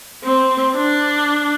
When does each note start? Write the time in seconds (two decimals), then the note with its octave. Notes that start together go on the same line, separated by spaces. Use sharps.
0.24 C4
0.76 D4